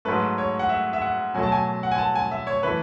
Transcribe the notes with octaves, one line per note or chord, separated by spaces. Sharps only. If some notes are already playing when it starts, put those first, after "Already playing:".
G#2 F#3 A3 B4
C#5
F#5
E5
E5
F#5
B2 F#3 A3 G#5
A5
G#5
F#5
G#5
A5
G#5
E5
C#5
E3 A3 B4